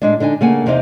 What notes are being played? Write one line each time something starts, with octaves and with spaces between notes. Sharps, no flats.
A2 G#3 D4
D3 D4 D#4 G#5
C#3 A3 A#3 F#5 G#5
E2 C3 C4 D#4 F5